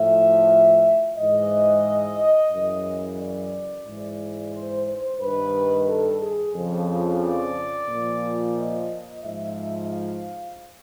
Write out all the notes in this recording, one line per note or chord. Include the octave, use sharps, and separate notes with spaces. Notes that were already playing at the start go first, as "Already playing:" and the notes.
Already playing: A2 F3 E5
G#2 E3 D#5
F#2 C#3 E3
D5
G#2 E3
C5
C5
G2 D#3 B4
A4
G#4
F2 C#3 F3
D5
A#2 F3
D#5
G#2 F3 E5
F5